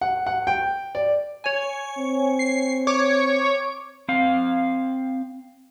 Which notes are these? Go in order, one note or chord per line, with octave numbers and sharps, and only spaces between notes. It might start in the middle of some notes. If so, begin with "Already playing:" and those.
F#5
F#5
G5
D5
C#5 G#5
C4
C7
C#5 D6
C4 F5